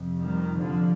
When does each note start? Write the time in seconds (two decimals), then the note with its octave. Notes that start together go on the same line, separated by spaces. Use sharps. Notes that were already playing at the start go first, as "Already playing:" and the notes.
Already playing: F2 C3
0.21 D#3 G3
0.59 D3 F3